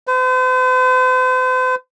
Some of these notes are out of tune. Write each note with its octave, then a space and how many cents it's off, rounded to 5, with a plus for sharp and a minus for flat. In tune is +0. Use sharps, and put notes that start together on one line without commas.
C5 -45